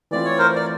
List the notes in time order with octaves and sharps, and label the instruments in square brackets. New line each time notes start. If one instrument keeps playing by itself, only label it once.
[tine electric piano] E3 A3 C4 F4 [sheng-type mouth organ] D5
[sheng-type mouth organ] C#5
A#4 C5
D5